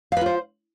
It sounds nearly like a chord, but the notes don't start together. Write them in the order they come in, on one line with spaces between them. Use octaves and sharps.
F5 B4 F4 C5